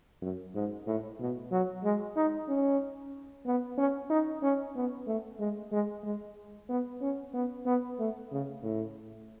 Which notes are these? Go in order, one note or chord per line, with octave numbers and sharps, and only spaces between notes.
F#2
G#2
A2
B2
F#3
G#3
D#4
C#4
B3
C#4
D#4
C#4
B3
A3
G#3
G#3
G#3
B3
C#4
B3
B3
A3
C#3
A2